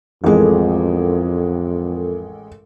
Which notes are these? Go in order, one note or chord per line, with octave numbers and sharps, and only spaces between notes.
A1 F2 G#3 A4 A#4